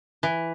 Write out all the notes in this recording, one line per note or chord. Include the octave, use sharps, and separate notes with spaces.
E3